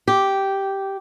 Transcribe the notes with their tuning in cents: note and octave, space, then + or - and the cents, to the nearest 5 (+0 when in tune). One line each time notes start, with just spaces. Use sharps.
G4 -10